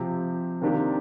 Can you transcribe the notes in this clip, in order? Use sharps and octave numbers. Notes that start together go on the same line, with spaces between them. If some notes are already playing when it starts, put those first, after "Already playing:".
Already playing: C3 F3 C4 G4
C3 D#3 A#3 D4 G4